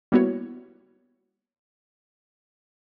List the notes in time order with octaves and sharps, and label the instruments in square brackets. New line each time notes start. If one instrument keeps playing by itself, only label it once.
[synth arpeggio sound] G3 A#3 B3 E4 F#4 C#5